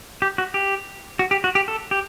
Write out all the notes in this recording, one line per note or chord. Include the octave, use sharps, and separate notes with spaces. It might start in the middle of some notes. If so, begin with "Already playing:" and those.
G4
F#4
G4
F#4
G4
F#4
G4
A4
G4